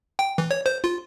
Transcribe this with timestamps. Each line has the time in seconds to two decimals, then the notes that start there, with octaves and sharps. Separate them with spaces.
0.19 G5
0.38 E3
0.51 C#5
0.66 C5
0.84 F4